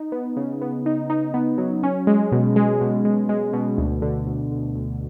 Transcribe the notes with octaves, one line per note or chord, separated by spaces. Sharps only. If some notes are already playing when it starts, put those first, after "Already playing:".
Already playing: D#4
B3
C#3
B3
D#4
D#4
B3
F#3
C#4
G#3
B2
G#3
B2
G#3
G#3
B2
D2
D3
D2
D2
D2